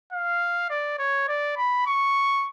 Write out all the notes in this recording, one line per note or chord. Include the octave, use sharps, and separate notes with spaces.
F5
D5
C#5
D5
B5
C#6